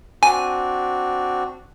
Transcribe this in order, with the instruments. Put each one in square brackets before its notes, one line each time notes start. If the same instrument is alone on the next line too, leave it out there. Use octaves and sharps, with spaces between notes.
[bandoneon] C4 D4 F#4 [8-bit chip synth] G#5